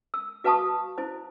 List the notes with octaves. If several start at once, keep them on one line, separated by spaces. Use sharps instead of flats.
E6
F#4 B4 F5 A5 C#6 D#6
E4 C5